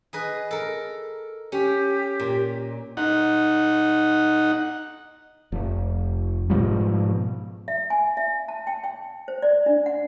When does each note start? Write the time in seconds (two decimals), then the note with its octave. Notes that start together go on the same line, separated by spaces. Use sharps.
0.13 G#4 B4 D#5
0.51 A4 A#4
1.52 C#4 G4
2.20 A#2
2.97 D#4 F#5
5.52 F1
6.50 G#2 B2 F3 G3
7.68 E5
7.90 G#5
8.17 E5
8.48 A5
8.67 G5
8.84 G5
9.28 C5
9.42 D5
9.66 D4
9.86 F#5